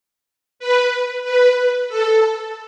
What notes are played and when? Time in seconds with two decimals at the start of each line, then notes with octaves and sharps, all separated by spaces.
0.59 B4
1.24 B4
1.89 A4